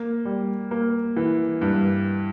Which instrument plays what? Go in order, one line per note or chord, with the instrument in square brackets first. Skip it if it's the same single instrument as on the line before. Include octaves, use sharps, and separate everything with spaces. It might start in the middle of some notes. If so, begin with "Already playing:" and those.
Already playing: [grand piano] A#3
G3
A#3
E3
G2